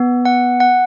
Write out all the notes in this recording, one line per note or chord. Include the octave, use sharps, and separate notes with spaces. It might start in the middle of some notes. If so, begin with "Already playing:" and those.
Already playing: B3
F#5
F#5